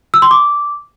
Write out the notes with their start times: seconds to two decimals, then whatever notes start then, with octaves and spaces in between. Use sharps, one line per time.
0.14 E6
0.22 C6
0.31 D6